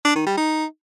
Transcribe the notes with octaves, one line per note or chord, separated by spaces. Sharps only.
D4
D#3
G3
D#4